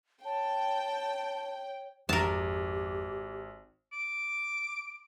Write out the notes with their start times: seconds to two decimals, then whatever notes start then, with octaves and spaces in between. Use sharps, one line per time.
0.25 C#5 G5 A5
2.09 G#1 F2 G4 A#4 A5
3.93 D6